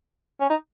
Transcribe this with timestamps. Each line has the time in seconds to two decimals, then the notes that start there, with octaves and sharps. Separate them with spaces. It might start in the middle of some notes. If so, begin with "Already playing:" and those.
0.41 C#4
0.50 D#4